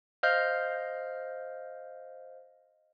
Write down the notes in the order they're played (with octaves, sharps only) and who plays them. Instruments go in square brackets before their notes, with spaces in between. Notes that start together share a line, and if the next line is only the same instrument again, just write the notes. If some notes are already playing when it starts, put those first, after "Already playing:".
[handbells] C5 D#5 F5 F6 G6